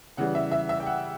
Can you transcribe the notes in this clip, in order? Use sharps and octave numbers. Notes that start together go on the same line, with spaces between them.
C#3 E3 G3 F#5
E5
E5
E5
G5
F#5